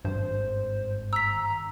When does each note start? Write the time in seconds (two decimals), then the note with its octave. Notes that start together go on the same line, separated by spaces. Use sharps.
0.05 G#1 G2 C5
1.13 A#5 E6 B6